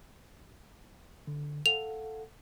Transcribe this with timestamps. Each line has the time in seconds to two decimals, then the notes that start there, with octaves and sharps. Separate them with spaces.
1.27 D3
1.66 A4 F5 F#5 F7